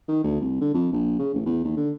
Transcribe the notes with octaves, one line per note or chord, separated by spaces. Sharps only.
D#3
D2
C2
D3
F2
A#1
C#3
A1
E2
D#2
D3